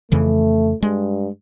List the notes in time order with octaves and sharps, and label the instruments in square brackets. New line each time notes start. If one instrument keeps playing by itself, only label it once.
[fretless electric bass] F2 C#3 E3 [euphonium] A3
[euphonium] G2 [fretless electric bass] G#3